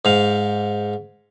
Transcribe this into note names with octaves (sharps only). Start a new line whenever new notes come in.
G#2 F5